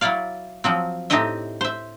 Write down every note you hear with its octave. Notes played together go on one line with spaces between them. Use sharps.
F#3 E4 C#5 D5 F5
F3 F#3 C4
A2 C4 D#4 G4 D#5 E5
C5 E5